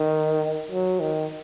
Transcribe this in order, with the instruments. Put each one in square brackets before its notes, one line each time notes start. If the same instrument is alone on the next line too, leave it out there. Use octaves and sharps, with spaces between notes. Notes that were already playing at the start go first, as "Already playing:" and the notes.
Already playing: [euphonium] D#3
F#3
D#3